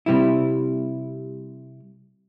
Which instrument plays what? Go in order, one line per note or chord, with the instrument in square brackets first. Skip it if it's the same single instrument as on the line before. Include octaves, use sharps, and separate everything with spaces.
[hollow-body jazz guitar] C3 G3 E4